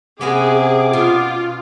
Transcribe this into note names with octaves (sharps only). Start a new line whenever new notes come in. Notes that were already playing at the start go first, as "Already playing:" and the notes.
C3 B3 C#4 F#4 G#4 D6
B2 F4